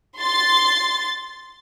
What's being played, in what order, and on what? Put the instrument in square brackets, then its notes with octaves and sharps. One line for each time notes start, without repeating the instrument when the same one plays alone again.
[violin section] C6 A6